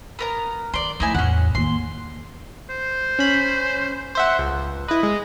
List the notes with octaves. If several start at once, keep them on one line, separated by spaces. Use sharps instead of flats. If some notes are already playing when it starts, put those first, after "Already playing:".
B3 A#4 A#5
D#3 D5 C6
F3 A3 D#4 E4 G#5
E2 A2 C#4 F#5
D#2 A#3 C6
C5
C#4 B5
C5 E5 F#5
C#2
E4 B4 D#5
G#3